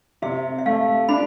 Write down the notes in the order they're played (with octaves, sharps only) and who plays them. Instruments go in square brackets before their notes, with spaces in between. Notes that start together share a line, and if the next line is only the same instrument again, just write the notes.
[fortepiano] C3 [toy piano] E5
[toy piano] E5
[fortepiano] A3 [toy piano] F5
[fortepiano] D4 [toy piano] B5